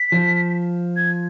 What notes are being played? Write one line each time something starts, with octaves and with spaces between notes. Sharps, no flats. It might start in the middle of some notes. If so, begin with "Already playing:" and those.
Already playing: B6
F3
G#6